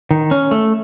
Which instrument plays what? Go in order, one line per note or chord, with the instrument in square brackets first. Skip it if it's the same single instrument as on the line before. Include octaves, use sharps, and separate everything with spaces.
[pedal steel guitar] D#3
C#4
A3